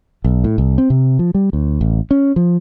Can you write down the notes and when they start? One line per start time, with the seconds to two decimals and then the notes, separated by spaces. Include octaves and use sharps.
0.24 B1
0.44 A2
0.58 C2
0.78 C4
0.90 C3
1.19 F3
1.35 G3
1.53 D2
1.81 A1
2.11 C#4
2.36 F3